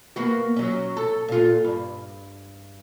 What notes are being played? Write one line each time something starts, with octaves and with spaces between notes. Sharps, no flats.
A#3 B3 F#4
F#3 C#4
A4
A#2 F4
G2